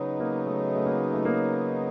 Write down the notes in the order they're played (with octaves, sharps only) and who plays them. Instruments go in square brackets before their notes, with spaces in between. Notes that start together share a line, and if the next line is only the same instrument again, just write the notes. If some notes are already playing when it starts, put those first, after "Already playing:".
Already playing: [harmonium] C#3 F#3 B3 D#4
[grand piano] A#3
A3
A3
A#3
A3
A#3